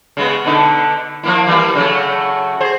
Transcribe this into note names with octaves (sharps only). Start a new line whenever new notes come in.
C#3 G#3 B3
B2 D3 D#4
F3 A#3 E4
E3 G3 A#3
C#3 F#3 A3
G#4 C5